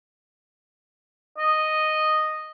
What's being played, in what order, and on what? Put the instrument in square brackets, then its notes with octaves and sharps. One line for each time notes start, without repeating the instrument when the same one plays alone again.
[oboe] D#5